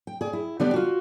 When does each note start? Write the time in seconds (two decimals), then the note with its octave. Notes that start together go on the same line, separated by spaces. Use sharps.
0.07 G5
0.21 G#4 D5
0.33 E4
0.59 D3 G3 B3 D4 G4 D5
0.74 F4 F#4